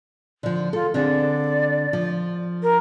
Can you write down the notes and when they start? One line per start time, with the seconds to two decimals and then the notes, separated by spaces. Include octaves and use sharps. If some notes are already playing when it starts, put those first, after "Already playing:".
0.43 D3 F3
0.73 F4 A4
0.94 D3 C4 G#4 D5
1.93 F3
2.62 A#4